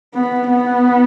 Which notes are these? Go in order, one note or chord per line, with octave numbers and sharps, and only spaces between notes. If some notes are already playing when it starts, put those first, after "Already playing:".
B3
B3